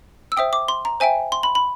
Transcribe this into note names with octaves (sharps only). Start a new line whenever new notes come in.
E6
C5 E5 G5 D#6
D6
C6
A#5
C5 E5 G5 G#5
C6
B5
B5